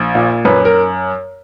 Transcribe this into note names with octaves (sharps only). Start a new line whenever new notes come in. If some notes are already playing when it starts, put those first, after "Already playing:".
Already playing: A#1
A#2
F#2 B4
A#4